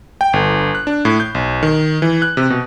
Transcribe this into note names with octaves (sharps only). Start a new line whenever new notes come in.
G5
G1
F#6
D4
A2
G6
B1
D#3
E3
F#6
C3
B2